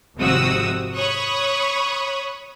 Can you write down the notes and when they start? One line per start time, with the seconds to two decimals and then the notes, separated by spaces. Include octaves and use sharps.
0.17 G#1 F2 C3 F#4 D#6 E6
0.94 C#5 B5 C#6 D#6 F#6